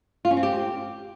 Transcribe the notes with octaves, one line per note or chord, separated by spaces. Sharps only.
F4
C#4
C4
G4